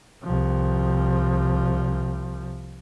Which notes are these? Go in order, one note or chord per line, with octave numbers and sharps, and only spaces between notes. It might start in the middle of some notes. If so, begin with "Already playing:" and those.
C2 F3